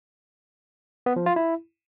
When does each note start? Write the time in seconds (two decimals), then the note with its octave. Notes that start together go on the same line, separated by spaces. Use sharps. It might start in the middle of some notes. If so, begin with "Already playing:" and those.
1.06 B3
1.16 F3
1.26 F4
1.36 E4